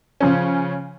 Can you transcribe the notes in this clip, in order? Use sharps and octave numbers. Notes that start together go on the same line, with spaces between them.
C#3 F3 C#4